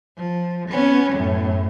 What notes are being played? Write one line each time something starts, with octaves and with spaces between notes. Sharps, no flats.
F3
B3 C#4
F#2 A2